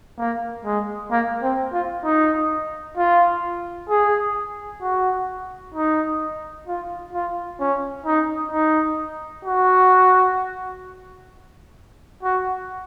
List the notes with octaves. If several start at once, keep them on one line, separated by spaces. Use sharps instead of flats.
A#3
G#3
A#3
C4
F4
D#4
F4
G#4
F#4
D#4
F4
F4
C#4
D#4
D#4
F#4
F#4